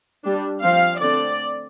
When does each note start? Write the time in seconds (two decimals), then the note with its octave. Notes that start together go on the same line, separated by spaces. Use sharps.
0.23 G3 D4
0.62 F3 C4 F5
1.00 D3 A3 C4 D5